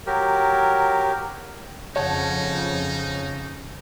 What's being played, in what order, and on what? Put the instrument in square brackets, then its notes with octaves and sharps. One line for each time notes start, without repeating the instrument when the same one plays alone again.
[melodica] F#3 G4 A#4
[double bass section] F2 [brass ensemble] C#3 [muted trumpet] D#4 [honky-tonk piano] C#5 F#5 A5